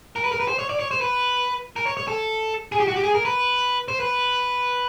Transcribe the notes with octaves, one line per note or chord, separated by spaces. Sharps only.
A#4
B4
A#4
B4
C5
C#5
D5
C#5
C5
B4
A#4
C#5
C#5
A4
G#4
G4
F#4
G4
G#4
A#4
B4
C5
B4